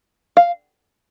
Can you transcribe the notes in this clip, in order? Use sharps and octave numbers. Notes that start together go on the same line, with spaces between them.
F5